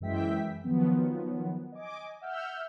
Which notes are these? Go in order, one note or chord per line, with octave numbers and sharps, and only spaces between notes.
F#2 E3 G#3 E5 G5 B6
D#3 F3 F#3 B3
D#5 G#5 D6
E5 F#5 E6 F6 G6